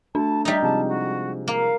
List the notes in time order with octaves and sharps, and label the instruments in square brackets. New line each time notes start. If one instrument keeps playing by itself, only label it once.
[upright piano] A3 [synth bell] D4 [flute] A5
[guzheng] G3 D#4 [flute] E5
[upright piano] C3 F3 G#3 [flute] A5
[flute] F#4
[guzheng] A#3 [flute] F5